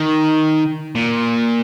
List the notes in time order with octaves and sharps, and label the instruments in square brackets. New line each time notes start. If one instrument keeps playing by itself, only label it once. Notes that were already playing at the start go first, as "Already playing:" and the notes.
Already playing: [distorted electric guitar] D#3
A#2